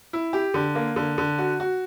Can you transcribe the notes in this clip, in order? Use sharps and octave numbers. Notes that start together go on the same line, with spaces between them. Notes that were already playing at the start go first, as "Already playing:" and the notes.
E4
G4
D3
A#3
D3
D3
F#4
F#4